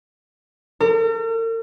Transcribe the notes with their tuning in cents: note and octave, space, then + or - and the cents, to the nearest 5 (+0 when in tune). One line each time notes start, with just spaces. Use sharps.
A#4 -45